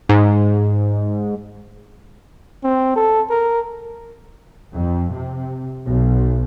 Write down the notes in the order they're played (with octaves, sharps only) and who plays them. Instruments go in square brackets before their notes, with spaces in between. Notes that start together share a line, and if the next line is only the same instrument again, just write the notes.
[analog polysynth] G#2
[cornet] C4
A4
A#4
[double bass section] F2
C3
B1